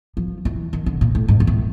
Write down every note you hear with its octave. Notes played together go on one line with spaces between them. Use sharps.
F3
E3
D#3
D3
A#2
A2
G#2
G#2
A2